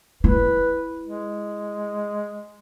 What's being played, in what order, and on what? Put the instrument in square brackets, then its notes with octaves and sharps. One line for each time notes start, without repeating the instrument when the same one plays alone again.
[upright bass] E4 [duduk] B4
[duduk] G#3